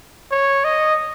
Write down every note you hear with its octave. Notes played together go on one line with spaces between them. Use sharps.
C#5
D#5